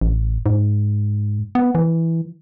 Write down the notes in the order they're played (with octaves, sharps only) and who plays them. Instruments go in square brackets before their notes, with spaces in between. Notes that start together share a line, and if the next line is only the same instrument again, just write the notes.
[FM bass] A1
G#2
B3
E3